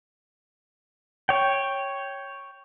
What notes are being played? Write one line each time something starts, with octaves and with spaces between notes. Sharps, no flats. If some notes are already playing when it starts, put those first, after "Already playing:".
C#5 G5